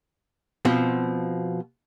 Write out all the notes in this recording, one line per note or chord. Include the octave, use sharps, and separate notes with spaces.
B2 F3 C4